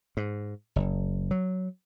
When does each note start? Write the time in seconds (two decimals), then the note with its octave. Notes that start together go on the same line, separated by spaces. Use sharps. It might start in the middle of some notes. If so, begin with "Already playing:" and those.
0.17 G#2
0.76 F#1
1.31 F#3